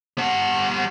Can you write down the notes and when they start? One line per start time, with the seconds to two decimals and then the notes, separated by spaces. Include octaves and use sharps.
0.18 G3 F#5